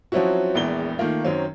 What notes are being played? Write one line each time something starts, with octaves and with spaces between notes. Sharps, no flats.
F3 F#3 C4 C#4 E4 F#4
E1 A#1 E2 E3 G7
D#3 A3 A#3 F4
F#2 D#3 F#3 C4 C#4